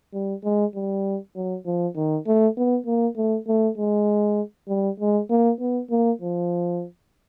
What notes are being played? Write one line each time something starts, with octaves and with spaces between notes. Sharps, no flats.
G3
G#3
G3
F#3
F3
D#3
A3
B3
A#3
A3
A3
G#3
G3
G#3
A#3
B3
A#3
F3